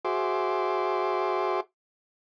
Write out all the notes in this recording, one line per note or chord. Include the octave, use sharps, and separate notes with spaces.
F#4 G#4 C5 E5 C6 D6